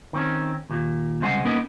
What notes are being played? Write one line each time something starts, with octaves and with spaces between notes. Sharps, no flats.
D#3 C4 C#4
D#2 A#2
C2 C#3 G#3 C5 F#5 G#5
A#3 B3 C#4 D#4 A#4 B4